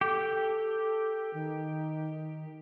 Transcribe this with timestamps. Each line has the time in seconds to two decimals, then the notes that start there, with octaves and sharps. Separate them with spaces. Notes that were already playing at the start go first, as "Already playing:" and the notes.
0.01 G4 A4
1.34 D#3